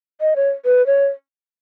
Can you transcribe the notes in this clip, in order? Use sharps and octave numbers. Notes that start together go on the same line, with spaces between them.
D#5
C#5
B4
C#5